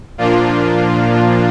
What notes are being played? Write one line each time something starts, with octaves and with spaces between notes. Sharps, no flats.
A#2 F3 A#3 D4 F4